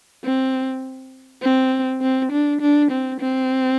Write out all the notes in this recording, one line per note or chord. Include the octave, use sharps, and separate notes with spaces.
C4
C4
C4
D4
D4
C4
C4